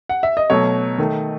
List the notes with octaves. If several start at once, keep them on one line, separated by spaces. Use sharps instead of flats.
F#5
E5
D#5
B2 F#3 A3 C#5
D#3 A3